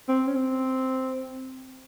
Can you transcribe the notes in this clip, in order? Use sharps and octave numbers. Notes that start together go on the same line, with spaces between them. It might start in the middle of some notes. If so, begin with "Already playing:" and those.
C4
C#4
C4